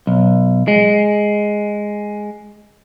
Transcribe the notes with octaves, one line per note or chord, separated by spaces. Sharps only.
B1
G#3